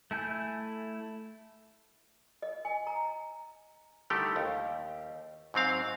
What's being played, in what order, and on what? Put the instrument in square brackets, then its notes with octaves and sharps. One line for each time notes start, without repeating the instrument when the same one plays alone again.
[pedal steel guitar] A3 E4 G#5 G6
[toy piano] D#5
G#5
A#5
[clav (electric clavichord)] D3 D#3 G3 A3 E4 G4
D#2
G#2 F#3 C4 F5